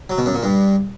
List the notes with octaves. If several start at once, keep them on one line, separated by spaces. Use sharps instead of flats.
F#3
B2
F#2
A#2
G2